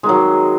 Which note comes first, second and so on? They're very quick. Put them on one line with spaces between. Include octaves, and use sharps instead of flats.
G#3 D#3 F#3